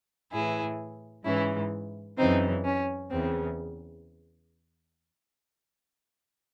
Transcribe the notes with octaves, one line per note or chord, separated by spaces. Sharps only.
A2 E3 E4 G#4
G#2 E3 C#4 E4
F#2 C#3 E3 C4 D#4
C#4
E2 C#3 E3 C4